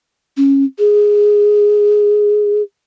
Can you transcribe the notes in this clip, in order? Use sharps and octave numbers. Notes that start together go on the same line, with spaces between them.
C#4
G#4